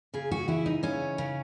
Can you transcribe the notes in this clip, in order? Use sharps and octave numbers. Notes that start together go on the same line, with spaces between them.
C#3 G#4
F#4
E3 E4
D#4
C#3 C#4
C#3